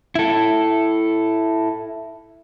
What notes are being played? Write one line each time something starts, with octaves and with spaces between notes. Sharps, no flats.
E4 A4